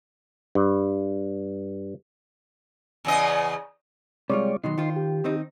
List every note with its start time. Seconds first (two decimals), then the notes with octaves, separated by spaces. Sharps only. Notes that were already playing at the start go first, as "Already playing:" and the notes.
0.55 G2
3.05 E2 C#3 D#5
4.30 C3 G3 G#3 F4 C#5 D5
4.64 B2 D#3 F#3 D#4 C6
4.78 D#3 F4 C5
4.96 G4
5.24 D#3 C4 D#4